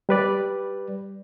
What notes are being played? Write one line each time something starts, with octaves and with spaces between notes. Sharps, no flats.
G3 B4 D5